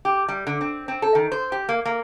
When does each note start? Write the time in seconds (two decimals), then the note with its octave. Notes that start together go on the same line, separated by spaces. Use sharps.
0.05 G4
0.28 G3
0.47 D3
0.61 C4
0.88 C4
1.02 A4
1.15 D#3
1.32 C5
1.52 G4
1.69 A#3
1.85 A#3